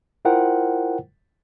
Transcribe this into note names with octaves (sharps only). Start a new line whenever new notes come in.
E4 F4 A#4 C5 F#5 G5